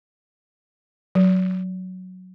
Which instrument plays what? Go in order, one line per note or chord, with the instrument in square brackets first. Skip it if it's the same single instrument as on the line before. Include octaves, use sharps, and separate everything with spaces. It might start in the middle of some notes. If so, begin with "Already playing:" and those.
[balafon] F#3